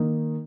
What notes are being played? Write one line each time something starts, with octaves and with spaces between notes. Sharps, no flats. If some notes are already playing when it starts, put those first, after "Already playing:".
Already playing: D#3 A#3 D#4